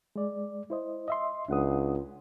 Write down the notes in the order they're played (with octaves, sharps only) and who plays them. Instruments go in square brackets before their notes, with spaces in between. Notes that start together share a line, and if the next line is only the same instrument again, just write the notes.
[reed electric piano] G#3 D5
E4 C5 D#5
D#5 E5 C6
[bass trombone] C#2 [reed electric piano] D4 F#5 D#6